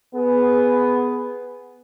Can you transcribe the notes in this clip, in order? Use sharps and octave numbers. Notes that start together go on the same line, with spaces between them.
B3 G#4